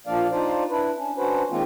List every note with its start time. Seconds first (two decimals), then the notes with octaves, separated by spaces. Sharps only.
0.07 A#2 F3 A#3 D4 D5 F5
0.31 D4 D#4 F4 C5 D5
0.70 D4 E4 B4
0.97 C#4 D4
1.18 C#4 D4 F#4 B4 C5
1.51 D#3 G#3 A#3 C4 F4